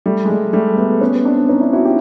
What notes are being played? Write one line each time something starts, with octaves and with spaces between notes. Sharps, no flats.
G3 A3
G#3
G3
G3 A3
A3 B3
B3 C#4
C4 D4
C#4 D#4
D4 E4
E4 F#4
F4 G4